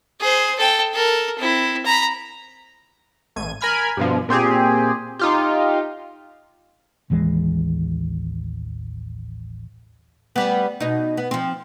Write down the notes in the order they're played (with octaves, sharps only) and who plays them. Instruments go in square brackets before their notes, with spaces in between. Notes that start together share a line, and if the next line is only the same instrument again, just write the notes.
[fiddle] G#4 C5
A4 G5
A4 A#4
C4 E4
A#5 B5
[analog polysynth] A1 G#6 D#7
A#4 G#5 B5 F6 G#6
G2 B2 F3
A#2 C4 G4 G#4
D#4 F4 G4
[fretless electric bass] A1 D#2 E3 G#3
[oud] G3 B3
B2 D#4
B3
F3 C4